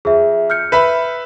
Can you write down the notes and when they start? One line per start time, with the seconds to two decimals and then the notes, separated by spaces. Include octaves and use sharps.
0.05 F2 G#4 E5
0.50 F6 G6 C#7
0.72 B4 E5 B5